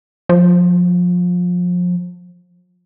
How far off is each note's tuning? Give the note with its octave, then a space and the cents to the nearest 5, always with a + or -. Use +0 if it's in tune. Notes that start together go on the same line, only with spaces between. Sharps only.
F3 +30